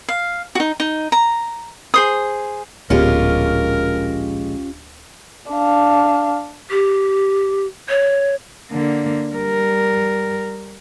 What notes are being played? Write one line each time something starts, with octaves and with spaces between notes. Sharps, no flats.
F5
D#4 F#4
D#4
A#5
G#4 C5 D#6
D1 A#1 G#3 B3 C#4 F4 G4 A#4
D4 F5
G4
C#5
D3 A#3
G3 A#4